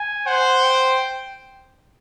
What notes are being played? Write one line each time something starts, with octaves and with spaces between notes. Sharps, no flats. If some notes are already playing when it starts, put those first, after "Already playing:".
Already playing: G#5
C5 F#5
G5